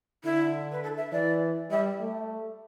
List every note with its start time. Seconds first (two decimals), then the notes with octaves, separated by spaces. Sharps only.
0.24 D3 E4
0.72 B4
0.83 A4
0.97 E5
1.12 E3 D5
1.71 G3 E5
2.00 A3